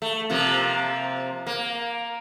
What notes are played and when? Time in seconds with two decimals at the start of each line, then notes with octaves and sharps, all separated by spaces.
0.02 A3
0.30 C3 F3 A#3
1.46 A#3